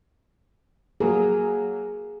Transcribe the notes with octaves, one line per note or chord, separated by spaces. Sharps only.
F#3 A#3 G#4